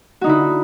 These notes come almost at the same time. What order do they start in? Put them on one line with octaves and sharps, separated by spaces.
F#4 D#4 D3 E4